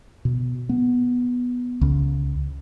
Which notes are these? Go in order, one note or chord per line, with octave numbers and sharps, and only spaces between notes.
B2
B3
C#2